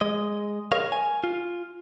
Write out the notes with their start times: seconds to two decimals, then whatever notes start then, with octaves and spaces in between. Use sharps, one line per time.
0.01 G#3 D#5
0.72 G#4 A#4 C#5 D#5 F5
0.92 G#5
1.24 F4